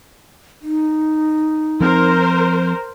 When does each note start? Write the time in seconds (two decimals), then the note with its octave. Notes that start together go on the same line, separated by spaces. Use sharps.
0.62 D#4
1.81 F3 C4 A#4 C5